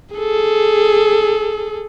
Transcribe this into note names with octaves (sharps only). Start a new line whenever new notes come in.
G#4 A4